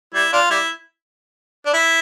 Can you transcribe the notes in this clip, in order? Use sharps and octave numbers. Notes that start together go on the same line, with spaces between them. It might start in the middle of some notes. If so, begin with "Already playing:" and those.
G3 E4
D4 F4
G3 E4
D4
E4